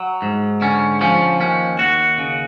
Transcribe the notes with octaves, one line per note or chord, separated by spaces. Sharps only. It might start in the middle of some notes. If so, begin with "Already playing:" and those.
Already playing: F#3
G#2
D3 C#4
F3 C#4
D#2 C#4
D#2 F#4
C#3